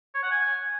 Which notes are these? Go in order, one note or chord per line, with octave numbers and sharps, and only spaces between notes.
C#5
F#5
G#5